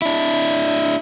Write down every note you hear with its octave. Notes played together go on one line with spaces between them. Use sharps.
D4 E4